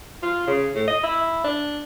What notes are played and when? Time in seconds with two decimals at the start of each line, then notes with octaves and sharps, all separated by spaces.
0.23 F4
0.47 C#3
0.75 A2
0.88 D#5
1.03 E4
1.44 D4